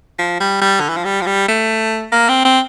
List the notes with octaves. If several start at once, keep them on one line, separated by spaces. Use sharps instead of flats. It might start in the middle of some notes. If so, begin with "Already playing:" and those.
F3
G3
G3
D3
E3
F3
G3
F3
G3
A3
A#3
C4
C4